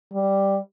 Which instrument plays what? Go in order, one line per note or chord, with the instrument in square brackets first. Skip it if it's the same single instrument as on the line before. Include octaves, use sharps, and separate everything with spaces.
[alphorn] G3